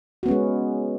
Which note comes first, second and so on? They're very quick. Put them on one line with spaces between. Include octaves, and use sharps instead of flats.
F#4 B3 C#4 G#3